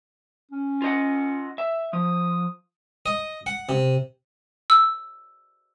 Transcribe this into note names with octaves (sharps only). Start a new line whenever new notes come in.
C#4
F4 D#5 F#5
E5
F3 D#6
D#5
F#5
C3
E6